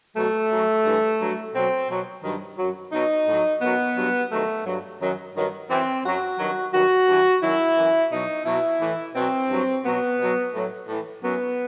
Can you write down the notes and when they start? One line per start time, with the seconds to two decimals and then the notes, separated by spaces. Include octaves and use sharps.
0.16 B2 F#3 A3
0.50 F#2 F#3
0.84 G2 E3
1.20 G2 F#3
1.54 B2 F#3 C4
1.89 B2 F#3
2.23 G2 D#3 F#3
2.58 F#2 F#3
2.92 B2 F#3 D#4
3.27 A2 F#3
3.61 F#2 F#3 B3
3.96 G2 F#3
4.30 G2 D#3 F#3 A3
4.66 G2 F#3
5.00 F#2 D#3 F#3
5.35 G2 D#3 F#3
5.69 F#2 E3 C4
6.04 F#2 F#3 F#4
6.38 G2 D#3 F#3
6.73 G2 D#3 F#3 F#4
7.08 G2 E3
7.42 F#2 D#3 F#3 E4
7.77 F#2 E3
8.12 B2 F#3 D#4
8.46 B2 F#3 E4
8.81 A2 E3
9.15 B2 F#3 C4
9.49 G2 F#3
9.85 B2 F#3 B3
10.19 B2 F#3
10.54 A2 F#3
10.88 A2 E3
11.23 F#2 F#3 B3